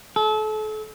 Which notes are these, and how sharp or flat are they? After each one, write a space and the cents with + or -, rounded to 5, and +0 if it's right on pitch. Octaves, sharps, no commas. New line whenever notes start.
A4 -35